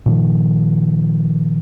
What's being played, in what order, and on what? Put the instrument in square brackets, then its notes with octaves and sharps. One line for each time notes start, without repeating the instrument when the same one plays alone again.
[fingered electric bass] A#2 D#3 F3